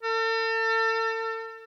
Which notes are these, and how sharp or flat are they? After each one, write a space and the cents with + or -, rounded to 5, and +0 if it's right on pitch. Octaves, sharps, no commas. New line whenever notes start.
A4 +40